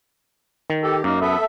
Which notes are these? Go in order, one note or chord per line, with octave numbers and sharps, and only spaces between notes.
D#3
G4 A4
F#2 A#3 D#4
B3 A4 E5